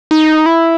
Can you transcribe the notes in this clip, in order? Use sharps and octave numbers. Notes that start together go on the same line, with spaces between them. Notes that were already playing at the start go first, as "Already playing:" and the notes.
D#4
E4